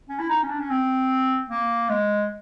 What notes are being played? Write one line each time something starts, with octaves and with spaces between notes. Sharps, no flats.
C#4
E4
D#4
C#4
D4
C#4
C4
A#3
G#3